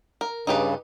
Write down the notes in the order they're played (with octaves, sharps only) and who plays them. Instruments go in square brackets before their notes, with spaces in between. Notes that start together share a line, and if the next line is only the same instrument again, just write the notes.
[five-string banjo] A#4
[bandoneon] G2 C#3 [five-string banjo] D#4 G4 B4